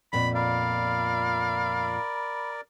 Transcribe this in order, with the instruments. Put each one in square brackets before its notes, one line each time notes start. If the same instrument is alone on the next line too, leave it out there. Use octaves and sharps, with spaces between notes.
[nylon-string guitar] F2 A#2 B3 [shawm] B5
[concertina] A#4 D5 [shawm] F5 [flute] B5